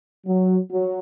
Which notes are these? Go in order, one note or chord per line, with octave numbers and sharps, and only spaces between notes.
F#3
F#3